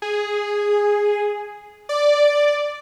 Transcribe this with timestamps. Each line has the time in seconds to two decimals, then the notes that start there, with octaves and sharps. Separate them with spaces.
0.02 G#4
1.89 D5